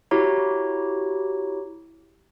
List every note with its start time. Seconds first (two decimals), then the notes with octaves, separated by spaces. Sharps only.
0.11 E4 F#4 G4 C#5 A#5